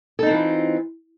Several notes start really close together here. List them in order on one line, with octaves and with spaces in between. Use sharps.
A4 D#4 C4 E3 F4